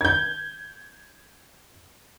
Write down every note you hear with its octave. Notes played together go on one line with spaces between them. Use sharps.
G6 G#6